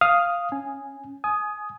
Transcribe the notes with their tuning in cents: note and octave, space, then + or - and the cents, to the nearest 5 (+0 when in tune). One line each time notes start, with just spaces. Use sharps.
F5 +0 D#6 +0
C#4 +0 G#5 +0
G#5 +30 D#6 +0